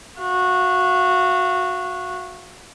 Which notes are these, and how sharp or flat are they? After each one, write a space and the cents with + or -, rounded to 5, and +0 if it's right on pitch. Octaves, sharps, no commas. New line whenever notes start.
F#4 -15 F5 -40